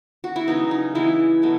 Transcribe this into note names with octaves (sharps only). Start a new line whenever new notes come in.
F#4
E4
C#3 F#3 B3 D#4
D#4
C#3 E3 G#3 B3 E4
B2 F#3 A3